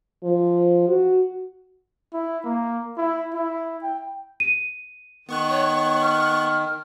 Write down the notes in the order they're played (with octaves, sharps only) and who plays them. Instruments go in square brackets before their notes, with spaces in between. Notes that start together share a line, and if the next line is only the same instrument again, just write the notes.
[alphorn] F3
F#4
[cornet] E4
A#3
E4
E4
G5
[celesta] D#7
[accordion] D#3 [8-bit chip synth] B3 C#6 F#6
[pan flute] C#5
F6